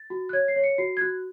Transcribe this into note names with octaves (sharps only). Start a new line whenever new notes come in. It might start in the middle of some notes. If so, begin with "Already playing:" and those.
Already playing: A6
F#4
F#6
C#5 G#6
C7
C#5
C#7
F#4 C7
G#6
F#4 F#6